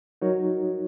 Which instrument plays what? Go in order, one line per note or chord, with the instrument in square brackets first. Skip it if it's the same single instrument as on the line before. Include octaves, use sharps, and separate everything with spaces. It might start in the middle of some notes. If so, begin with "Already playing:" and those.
[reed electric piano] F#3 D#4 F#4 A#4 C#5